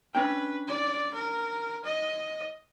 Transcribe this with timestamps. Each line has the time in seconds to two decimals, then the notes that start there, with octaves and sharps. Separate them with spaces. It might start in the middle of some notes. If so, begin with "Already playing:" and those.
0.15 C#4 D4 B4 G5
0.68 D5
1.14 A#4
1.85 D#5